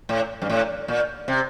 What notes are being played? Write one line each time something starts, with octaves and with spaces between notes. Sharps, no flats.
A2
G2
A2
A#2
C3